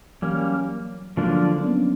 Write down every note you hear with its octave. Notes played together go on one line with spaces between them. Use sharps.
E3 F#3 G3 A#3 C#4
D3 F3 F#3 G#3 A#3 D4
D4
B3 C#4